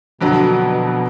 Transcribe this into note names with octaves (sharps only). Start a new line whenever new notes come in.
F2 B2 D3 F#3
B2